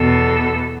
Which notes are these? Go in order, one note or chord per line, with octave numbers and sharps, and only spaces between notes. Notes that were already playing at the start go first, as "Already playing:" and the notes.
Already playing: E2 B2 B3 A4